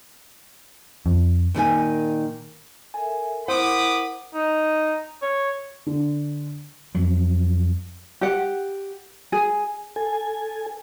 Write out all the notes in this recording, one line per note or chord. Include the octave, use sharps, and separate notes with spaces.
F2
A#2 D#3 A#4 G#5
A4 A#4 E5 G#5
E4 A#4 C5 F#5 B5 D6 D#6
D#4
C#5
D3
F2 F#3
G4 F#5
G#4
A4 G#5